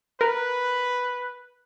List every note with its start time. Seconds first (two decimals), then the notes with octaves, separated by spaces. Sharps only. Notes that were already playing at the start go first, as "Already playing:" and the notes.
0.21 A#4 B4